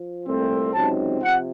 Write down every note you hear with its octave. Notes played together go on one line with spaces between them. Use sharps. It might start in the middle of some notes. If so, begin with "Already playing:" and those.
Already playing: F3
C2 A#2 A3 C4
C#2 C3 F#3 C4 D#4 A5
C3 F3 F#5